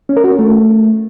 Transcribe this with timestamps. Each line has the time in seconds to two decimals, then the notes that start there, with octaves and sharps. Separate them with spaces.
0.09 C#4
0.17 A#4
0.24 F#4
0.31 C#4
0.39 A3